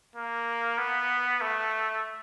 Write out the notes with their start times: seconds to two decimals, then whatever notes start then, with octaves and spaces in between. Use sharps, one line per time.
0.16 A#3
0.78 B3
1.41 A3